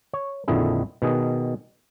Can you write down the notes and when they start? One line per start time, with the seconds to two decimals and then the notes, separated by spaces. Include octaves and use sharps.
0.13 C#5
0.48 A#1 F2 D3 D#3 E4 G#4
1.02 B2 D#3 G#4